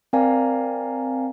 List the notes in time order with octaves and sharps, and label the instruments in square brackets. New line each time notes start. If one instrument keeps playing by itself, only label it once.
[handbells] C4 A#4 D5 F5 G#5 A#5